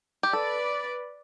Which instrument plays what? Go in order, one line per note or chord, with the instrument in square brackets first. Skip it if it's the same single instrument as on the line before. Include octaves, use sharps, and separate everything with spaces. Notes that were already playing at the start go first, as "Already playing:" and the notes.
[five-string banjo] G4
[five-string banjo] A4 [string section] B4 D5